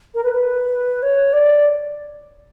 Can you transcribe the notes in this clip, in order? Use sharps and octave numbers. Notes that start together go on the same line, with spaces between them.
A#4
B4
B4
C#5
D5